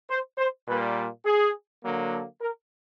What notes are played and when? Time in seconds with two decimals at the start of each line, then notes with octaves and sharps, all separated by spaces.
0.10 C5
0.38 C5
0.67 A#2 G3 A#3 B4
1.25 G#4
1.83 D3 F#3 A#3
2.12 A4
2.41 A#4